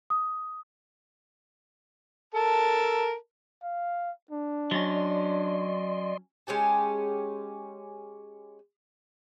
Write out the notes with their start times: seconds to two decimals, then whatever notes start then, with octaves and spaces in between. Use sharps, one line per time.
0.10 D#6
2.34 A4 A#4 A5
3.63 F5
4.31 D4
4.71 F#3 C#4 D5 D#5 C6
6.47 G#3 C#4 G4 A5